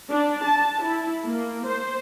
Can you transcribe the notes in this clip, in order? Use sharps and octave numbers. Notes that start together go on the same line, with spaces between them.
D4
A5
E4
A#3
C5